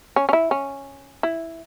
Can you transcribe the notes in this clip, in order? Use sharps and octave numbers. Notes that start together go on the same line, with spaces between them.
C#4
C#4
E4
C#4
E4